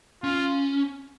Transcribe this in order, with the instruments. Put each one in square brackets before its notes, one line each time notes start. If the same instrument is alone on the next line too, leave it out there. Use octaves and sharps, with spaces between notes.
[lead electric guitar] C#4 [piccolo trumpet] F4